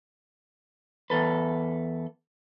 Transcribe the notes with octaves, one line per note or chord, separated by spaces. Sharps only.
E2 A4 B4